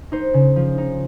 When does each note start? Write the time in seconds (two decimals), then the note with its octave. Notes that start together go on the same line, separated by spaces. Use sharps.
0.12 D#4 C5
0.34 C#3
0.56 F3
0.78 D#4